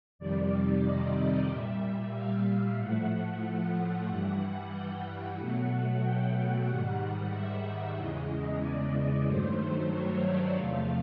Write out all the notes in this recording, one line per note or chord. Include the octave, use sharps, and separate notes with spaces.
F2 C3 D#3 G3 D5
D#5
A#2 G3 E5
F5
A2 F3 A3 F#5
F#5
G2 E3 G3 F#5
G5
B2 F#3 A3 F#5
G5
G#2 D#3 G3 F#5
F#5
E5
E2 C#3 E3 G#3 D#5
D5
G2 D#3 F#3 A3 C5
C#5
D5
E2 C3 F3 A3 F5